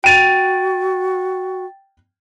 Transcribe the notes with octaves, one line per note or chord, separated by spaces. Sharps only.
F#4 G5 A6 D7 D#7 F7